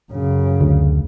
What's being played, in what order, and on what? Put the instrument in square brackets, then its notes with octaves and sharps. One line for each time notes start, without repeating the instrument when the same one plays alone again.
[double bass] F#2 C#3
[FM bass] D2